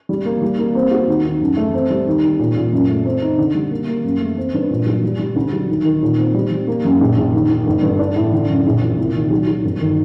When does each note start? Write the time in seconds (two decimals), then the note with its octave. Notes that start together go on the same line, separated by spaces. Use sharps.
0.09 G3
0.25 A#3
0.42 G3
0.59 A#3
0.75 C4
0.91 F#4
1.07 D#2
1.24 D#2
1.41 F#2
1.57 A3
1.74 C4
1.90 G3
2.07 D#2
2.23 D#2
2.39 A#2
2.56 A#2
2.73 F#2
2.90 A3
3.05 C4
3.21 D#4
3.38 D3
3.55 G3
3.71 A#3
3.88 A#3
4.04 F#2
4.21 A3
4.37 C4
4.54 G2
4.71 A#2
4.86 F#3
5.03 G3
5.19 G3
5.36 D2
5.53 F#3
5.68 D#2
5.85 D#3
6.02 A#2
6.18 C4
6.34 G3
6.51 G3
6.67 A#3
6.84 F#2
7.01 A#1
7.17 A#1
7.33 D#2
7.50 D#2
7.67 G1
7.82 G2
7.99 D4
8.16 A2
8.32 D3
8.49 F#2
8.66 A#1
8.82 A#2
8.98 C2
9.15 D#3
9.31 F#3
9.48 F#3
9.64 G1
9.80 D#3